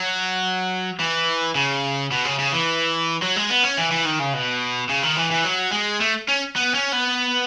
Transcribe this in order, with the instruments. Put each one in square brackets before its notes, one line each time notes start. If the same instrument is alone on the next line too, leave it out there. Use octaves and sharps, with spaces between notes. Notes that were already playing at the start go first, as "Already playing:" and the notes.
Already playing: [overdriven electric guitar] F#3
E3
C#3
B2
C#3
C#3
E3
F#3
G#3
B3
C#4
E3
E3
D#3
C#3
B2
C#3
D#3
E3
E3
F#3
G#3
A3
C#4
B3
C#4
B3